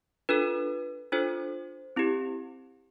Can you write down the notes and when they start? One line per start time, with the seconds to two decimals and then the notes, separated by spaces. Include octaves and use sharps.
0.29 D4 F4 A4 B4
1.12 D4 F4 A4 C5
1.96 C4 E4 G4